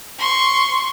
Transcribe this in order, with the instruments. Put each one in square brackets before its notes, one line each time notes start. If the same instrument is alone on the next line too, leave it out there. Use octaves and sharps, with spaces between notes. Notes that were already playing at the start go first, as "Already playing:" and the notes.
[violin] C6 C#6